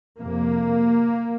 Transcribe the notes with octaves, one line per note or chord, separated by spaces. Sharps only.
F2 C3 A#3